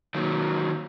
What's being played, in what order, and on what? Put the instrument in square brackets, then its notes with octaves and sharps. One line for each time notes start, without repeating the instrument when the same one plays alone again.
[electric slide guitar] D#3 F#3 A#3